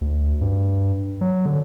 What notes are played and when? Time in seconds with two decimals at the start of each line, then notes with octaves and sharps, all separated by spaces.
0.01 D2
0.41 G2
1.21 F#3
1.46 D3